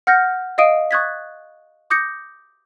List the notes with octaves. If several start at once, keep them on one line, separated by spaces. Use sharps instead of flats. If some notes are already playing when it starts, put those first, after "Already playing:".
F#5 F6 G6 A#6 C#7
D#5 F5 D#6 D7 D#7
C#6 D#6 F#6 G#6 A6 B6
D6 D#6 G6 A#6 C#7